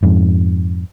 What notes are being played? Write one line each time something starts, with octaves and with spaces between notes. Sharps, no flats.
F2 G#2